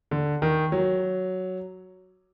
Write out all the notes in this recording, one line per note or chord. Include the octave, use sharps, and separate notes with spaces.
D3
D#3
F#3